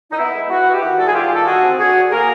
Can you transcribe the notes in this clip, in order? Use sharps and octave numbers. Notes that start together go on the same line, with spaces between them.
D#4
B3 E4
G#3
B3 E4 F#4
B3
G4
D#3 E4 F#4
G3 A4
G#4
G3 F4 G4
D#3 A4
D3 F#4 G#4
C4
D3 F#4 G#4
D3
A#3 G#4 A#4